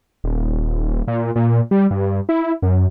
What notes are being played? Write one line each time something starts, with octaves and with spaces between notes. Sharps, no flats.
D#1
A#2
A#2
G3
G2
E4
F#2